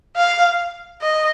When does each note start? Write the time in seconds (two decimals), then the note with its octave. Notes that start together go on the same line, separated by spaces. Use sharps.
0.17 F5
1.02 D#5